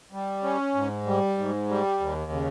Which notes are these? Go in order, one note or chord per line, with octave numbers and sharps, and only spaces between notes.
G3
C#4
G#2
G3
G#2
G3
D#2
C#3